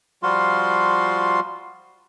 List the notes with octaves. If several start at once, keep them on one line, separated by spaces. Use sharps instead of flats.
F3 G3 F4 F#4 F5 C6